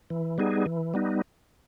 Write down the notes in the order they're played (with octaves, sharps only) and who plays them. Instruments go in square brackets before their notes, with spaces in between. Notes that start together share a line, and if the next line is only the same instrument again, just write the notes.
[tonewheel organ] E3
G3 B3 D#4 G#4
E3
G3 B3 D#4